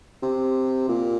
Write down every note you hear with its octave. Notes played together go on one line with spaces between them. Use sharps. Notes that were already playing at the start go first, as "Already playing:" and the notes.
C3
A#2